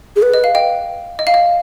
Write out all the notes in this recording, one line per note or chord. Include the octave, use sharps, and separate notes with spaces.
G#4
B4
D#5
F5
D#5 G5
D#5
F5
D#5